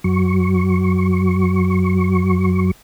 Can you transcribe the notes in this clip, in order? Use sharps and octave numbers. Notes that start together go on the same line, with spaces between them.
F#2 F#3 C#6